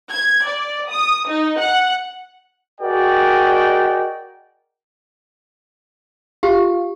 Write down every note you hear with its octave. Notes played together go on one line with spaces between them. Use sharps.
G#6
D5
D#6
D#4
F#5
F#4 G#4 A#4 D5 D#5 G5
F4 G4